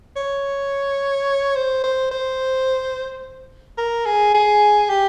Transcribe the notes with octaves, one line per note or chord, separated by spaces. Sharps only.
C#5
C5
C5
C5
A#4
G#4
G#4
G4